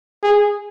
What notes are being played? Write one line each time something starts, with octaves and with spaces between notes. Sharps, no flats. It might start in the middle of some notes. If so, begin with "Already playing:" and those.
G#4